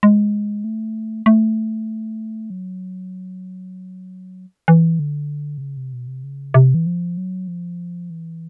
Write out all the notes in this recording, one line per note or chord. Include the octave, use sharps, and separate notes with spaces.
G#3
A3
A3
F#3
E3
D3
C3
C#3
C3
B2
C3
C#3
C3
E3
F3
F#3
F3
E3